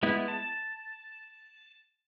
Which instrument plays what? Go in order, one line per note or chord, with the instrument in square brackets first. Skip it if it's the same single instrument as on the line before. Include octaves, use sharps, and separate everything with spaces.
[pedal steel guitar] G#3 B3 E4
A5